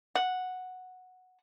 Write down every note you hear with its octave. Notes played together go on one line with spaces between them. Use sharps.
F#5